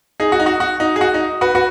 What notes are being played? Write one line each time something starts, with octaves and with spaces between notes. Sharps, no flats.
D#4 G#4
F#4
D#4
F#4
F#4
D#4
G#4
F#4
D#4
F#4 B4
F#4 B4